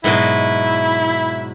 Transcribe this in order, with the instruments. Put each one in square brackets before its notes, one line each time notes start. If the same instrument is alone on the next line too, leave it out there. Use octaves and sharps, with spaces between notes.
[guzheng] G#2 B2 F#3 [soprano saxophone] E4